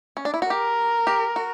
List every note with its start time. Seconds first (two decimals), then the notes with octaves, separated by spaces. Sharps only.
0.17 C#4
0.25 D4
0.34 E4
0.42 F#4
0.50 G4 A#4
1.07 G4
1.36 F#4